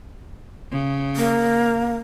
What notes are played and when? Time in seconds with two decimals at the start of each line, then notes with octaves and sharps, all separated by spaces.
0.71 C#3
1.16 A#3